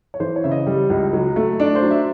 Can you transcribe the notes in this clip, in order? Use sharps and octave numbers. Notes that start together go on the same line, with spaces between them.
C#5
E3 C5
C#5
C#3 E5
D#5
G3
C#2
F#3
A3
D4 D5
C5
F#3
E5